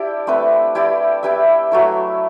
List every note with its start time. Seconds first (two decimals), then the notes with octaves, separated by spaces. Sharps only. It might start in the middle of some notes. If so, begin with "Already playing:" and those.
Already playing: D4 E4 G4 D5 E5
0.27 A3 C4 E4 B4
0.75 E4 G4 D5
1.23 E4 G4 B4 E5
1.72 F#3 A3 E4